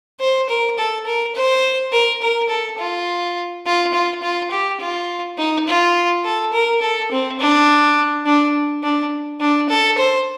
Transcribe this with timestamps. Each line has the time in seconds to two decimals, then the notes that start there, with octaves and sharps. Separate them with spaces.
0.20 C5
0.49 A#4
0.78 A4
1.06 A#4
1.35 C5
1.92 A#4
2.22 A#4
2.50 A4
2.78 F4
3.66 F4
3.93 F4
4.22 F4
4.51 G4
4.80 F4
5.38 D#4
5.67 F4
6.25 A4
6.53 A#4
6.82 A4
7.11 C4
7.39 D4
8.26 D4
8.83 D4
9.40 D4
9.70 A4
9.98 C5